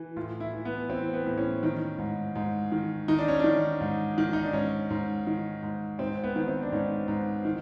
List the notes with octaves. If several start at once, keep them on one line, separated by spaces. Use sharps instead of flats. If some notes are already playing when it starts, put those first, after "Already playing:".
Already playing: E3
A2 F4
E4
E3
B3
E3 C4
B3
A2
C#4
D#3
G#2
G#2
D#3
D#3 D#4
D4
C#4
D#3 D4
G#2
D#3
D#4
D4
G#2 C#4
G#2
D#3
G#2
G#2 C4
B3
D#3
C4
D4
G#2 C#4
G#2
D#3